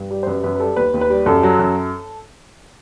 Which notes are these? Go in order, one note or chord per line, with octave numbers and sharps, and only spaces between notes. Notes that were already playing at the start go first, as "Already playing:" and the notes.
Already playing: G2
G3
C5
F#2 B4
F#2 B4
B4
G3 A4
D#2 B4
D#2
B4
G3
F#2 A4
F#3
F#2